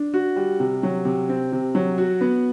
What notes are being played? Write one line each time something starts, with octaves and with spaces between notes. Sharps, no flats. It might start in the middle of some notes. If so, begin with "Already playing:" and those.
Already playing: D4
F#4
G3
C3
F#3
C3
C4
C3
F#3
F#4
B3